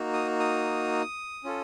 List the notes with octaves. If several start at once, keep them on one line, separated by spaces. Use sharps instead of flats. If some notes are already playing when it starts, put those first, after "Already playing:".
Already playing: A#3 D#4 F#4
D#6
D#6
C#4 F4 A4